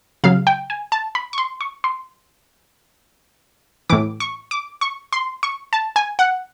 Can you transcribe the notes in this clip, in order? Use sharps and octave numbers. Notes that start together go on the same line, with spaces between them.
C#3 F#3 F5
G5
G#5
A5
B5
C#6
C6
C#6
C6
A2 E3 D6
C#6
D6
C#6
C6
C#6
A5
G#5
F#5